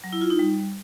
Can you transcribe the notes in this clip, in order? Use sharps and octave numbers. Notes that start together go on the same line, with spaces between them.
F#3
E4
F4
D#4
G3